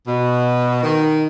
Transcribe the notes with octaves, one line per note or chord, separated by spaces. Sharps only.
B2
D#3